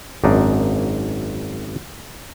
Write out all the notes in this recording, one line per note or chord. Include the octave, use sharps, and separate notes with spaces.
G#1 F#2 D4 D#4